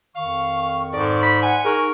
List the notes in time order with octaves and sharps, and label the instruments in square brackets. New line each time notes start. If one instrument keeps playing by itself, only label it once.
[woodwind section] F2 D#3 C#6 [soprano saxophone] F5
[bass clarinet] G#2 [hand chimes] A4 [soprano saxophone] D5
[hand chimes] D5 [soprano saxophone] B5
[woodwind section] F#5 [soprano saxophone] G#5
[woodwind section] D#4 [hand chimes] G#4 C#6 F6 [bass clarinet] A#4